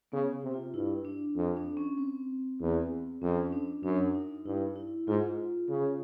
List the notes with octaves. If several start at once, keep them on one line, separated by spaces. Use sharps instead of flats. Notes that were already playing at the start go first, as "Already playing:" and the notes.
C#3 B3
C3
F4
G2 E4
D4
F2
D4
C#4
C4
E2
F2 C#4
D4
F#2 D4
D#4
G2 E4
E4
G#2 F4
C#3